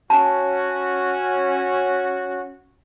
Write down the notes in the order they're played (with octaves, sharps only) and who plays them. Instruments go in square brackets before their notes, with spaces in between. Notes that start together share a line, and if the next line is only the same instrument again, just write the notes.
[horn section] C#4 F#4 [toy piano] G#5 A5